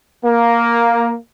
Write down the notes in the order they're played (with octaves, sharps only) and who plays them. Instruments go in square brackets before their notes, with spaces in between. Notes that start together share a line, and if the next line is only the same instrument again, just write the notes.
[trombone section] A#3